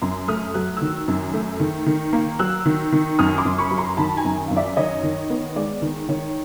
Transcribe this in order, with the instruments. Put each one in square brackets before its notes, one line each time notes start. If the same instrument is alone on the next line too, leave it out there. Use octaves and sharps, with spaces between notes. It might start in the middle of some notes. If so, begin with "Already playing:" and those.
[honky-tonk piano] F#2 A#5 C6
A3 D#6 F6
F#3 F#6
D#3 E6 F#6
F#2
A3
D#3
D#3
A#3
F#3 E6 F#6
D#3
D#3
F#2 D#6 F6
C6 D6
F#2
B5 C#6
F#3
A#5 C6
D#3 A5 B5
G#5 A#5
F#2
F#2 F5
D5 E5
D#3 C#5 D#5
D#3
B3
G#3 D5
D#3
D#3 C#5